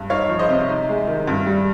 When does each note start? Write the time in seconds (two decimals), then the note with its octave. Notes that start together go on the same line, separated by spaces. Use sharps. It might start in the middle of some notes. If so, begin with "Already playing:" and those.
Already playing: G2
0.10 D#4 C#5 F5
0.29 F3
0.39 C5 D#5
0.49 C3
0.69 D#4
0.89 G#3
1.07 D#3
1.27 G2
1.46 G3